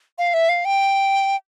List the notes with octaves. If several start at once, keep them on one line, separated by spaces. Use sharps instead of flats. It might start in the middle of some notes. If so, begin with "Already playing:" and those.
F5
E5
F5
G5